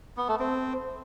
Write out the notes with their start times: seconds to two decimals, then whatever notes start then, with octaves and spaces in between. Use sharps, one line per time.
0.17 B3
0.28 A3
0.40 C4